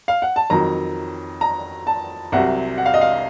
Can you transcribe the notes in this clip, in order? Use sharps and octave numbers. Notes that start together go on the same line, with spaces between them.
F5
F#5
A5
F2 D#3 F#3 A#5
A#5
A5
C2 C3 F#3 F#5
F#5
F5
D#5
F5